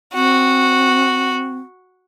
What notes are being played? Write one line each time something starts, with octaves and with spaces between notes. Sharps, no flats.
C4 F#4